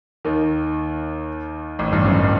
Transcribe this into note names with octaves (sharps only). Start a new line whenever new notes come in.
D#2 D#3
A1 A2
G1 G2
F#1 F#2